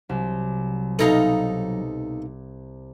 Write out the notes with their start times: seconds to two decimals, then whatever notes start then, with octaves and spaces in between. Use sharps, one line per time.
0.09 C2 F#3
0.99 B2 D#4 A4 F5